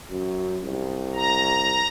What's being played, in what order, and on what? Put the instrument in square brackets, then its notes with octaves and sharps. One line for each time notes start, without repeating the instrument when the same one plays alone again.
[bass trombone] F#2
C2
[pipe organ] A#5